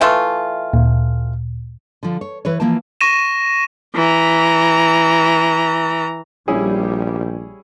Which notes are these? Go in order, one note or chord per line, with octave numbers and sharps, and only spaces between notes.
E3 A3 F4
D2 A#2
D3 F3
C#5
E3 B4 C#5
E3 F3 A#3 G5 A5
C#6 A#6 D#7 E7
E3 A#5
A#1 G3 C#4 E4 G#4